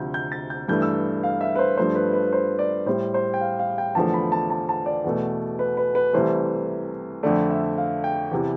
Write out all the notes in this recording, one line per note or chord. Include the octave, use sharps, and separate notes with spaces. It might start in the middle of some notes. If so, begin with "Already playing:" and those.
Already playing: D2 C3 F3 G6
G6
A6
G6
G2 E3 A3 G6
E6
F5
E5
B4
C5
G2 F3 A3 C5
B4
B4
C5
D5
A2 G3 C5
C5
G5
F5
F5
G5
E2 D3 F3 A3 A5
B5
A5
A5
A5
D5
E2 B2 A3
B4
B4
B4
C2 C3 E3 A3 C5
F2 D3 A3 D5
E5
F5
G5
E2 C3 E3